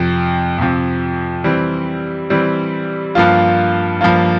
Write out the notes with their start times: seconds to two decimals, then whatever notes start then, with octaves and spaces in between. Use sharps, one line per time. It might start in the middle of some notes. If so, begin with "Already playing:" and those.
Already playing: F2 C3 F3
0.58 F2 C3 F3
1.44 E3 G3 C4
2.30 E3 G3 C4
3.15 G2 F3 A#3 F4
4.01 G2 F3 A#3 F4